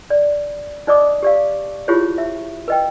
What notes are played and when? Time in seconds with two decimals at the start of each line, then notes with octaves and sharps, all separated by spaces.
0.10 D5
0.87 D#4 C5 D5 D#5 D6 D#6
1.23 G4 D5 F5
1.88 E4 F4 G4 G#4 C5 C#5
2.18 E5
2.68 B4 D#5 G5